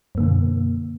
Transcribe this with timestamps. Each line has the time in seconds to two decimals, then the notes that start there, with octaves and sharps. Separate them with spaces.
0.15 F#2
0.18 A#3
0.20 D3
0.23 B2